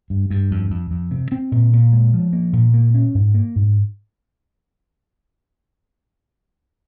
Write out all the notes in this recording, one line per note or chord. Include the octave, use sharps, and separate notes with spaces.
G2
G2
F2
F2
F2
C3
C4
A#2
A#2
G#3
F3
A#3
A#2
A#3
C#4
G#2
A#3
G#2